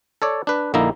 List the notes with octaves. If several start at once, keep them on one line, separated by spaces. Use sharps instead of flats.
A4 C#5 D5
D4 B4
A#1 D3 A#3 D#4 E4 A#5